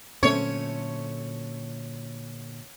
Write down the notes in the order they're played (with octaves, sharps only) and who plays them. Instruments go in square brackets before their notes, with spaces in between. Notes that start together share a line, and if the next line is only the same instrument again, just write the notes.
[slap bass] A#2 D3 F#3 [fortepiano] A3 C4 C#4 [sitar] C#5